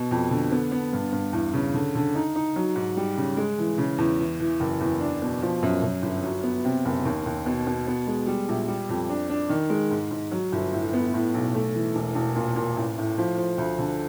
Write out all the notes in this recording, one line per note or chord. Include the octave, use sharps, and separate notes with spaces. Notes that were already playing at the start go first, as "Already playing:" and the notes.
Already playing: B2
F2
D3
B3
B3
G2
G2
E2
C#3
D3
D3
D#4
D#4
F#3
G#2
G3
C#3
G#3
E3
C#3
E2
E3
E3
F#1
E2
D4
B2
F3
F#2
F#2
G1
F#3
B3
C3
F#1
D#2
D#2
B2
B2
B3
G#3
G3
A#1
G3
F2
D4
D4
D#3
G#3
G#2
G#2
F#3
G1
A2
B3
A2
B1
A3
E3
E1
E1
A#2
A#2
A1
A2
F3
F3
D2
D3